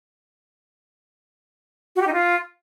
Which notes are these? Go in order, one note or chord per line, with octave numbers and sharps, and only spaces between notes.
F#4
G4
D#4
F4